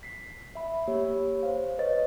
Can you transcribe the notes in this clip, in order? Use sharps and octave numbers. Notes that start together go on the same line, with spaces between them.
B6 C7
E5 B5
A#3 G4 C#5
C5 F5
B4 C#5 D#5 A6